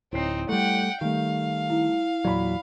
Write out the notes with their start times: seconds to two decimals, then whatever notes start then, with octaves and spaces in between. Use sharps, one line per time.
0.13 D1 C4 D#4 E4 C#5 C7
0.49 G3 A3 F#5 G5
1.01 D#3 G3 A3 F5
1.70 E4
2.25 E2 A#2 F#3 D5 B5